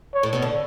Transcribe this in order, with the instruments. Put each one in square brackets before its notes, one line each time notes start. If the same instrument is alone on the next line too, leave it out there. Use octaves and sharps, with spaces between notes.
[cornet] C#5
[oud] A2
B2
D3